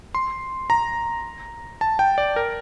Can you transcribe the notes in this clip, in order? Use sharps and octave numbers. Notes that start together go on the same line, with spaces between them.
C6
A#5
A5
G5
D5
A#4